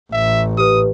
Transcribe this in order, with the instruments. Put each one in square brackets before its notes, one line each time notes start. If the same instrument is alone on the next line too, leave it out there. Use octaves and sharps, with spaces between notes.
[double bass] A1 [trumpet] E5
[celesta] G4 B4 [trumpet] D#6